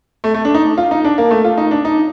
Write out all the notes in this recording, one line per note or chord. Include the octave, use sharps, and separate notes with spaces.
A3
A3
D4
D#4
F4
D#4
D4
A#3
A3
F4
D#4
D4
D#4